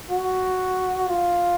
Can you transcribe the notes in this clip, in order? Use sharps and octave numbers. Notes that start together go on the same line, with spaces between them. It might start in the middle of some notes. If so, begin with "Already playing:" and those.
F#4
F4